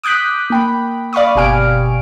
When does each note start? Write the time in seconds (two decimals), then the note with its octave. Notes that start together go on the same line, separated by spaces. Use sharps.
0.04 D6 D#6 F#6 G6 B6
0.50 A#3 G5 B5
1.13 D5 F5 B5 C#6 D#6
1.35 G1 B2 G4 G#5 F6 D7